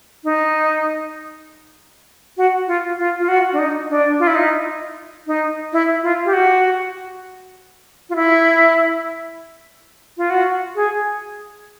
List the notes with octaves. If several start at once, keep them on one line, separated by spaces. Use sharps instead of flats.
D#4
F#4
F4
F4
F4
F#4
D4
D#4
D4
F4
E4
D#4
D#4
E4
F4
G4
F#4
F4
E4
F4
F#4
G#4